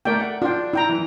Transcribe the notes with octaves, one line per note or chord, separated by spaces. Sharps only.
A3 A#4 D5 G5
F#5
D4 F4 G5
E4 G5 A#5
E3